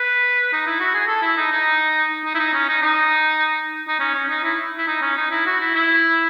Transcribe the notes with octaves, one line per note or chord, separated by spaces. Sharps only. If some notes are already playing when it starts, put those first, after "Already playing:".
Already playing: B4
D#4
E4
F#4
G#4
A4
E4
D#4
D#4
D#4
E4
D#4
C#4
D#4
D#4
D#4
C#4
C#4
D#4
E4
E4
D#4
C#4
D#4
E4
F#4
E4
E4